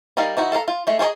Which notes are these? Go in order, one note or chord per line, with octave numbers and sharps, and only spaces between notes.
G3 D#4 A#4 D5 F5
E3 D#4 E4 F#4
A4 F5 F#5 A#5
F4
G#3 A3
F4 G#4 C#5 D#5 A#5